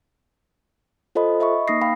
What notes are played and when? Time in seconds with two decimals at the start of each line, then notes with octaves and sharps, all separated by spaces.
1.15 F4 A4 C5 D#5 B5
1.40 D#5 E5 B5 C#6
1.68 A#3 D#4 D#6 A#6 C7
1.82 F5 G5 B5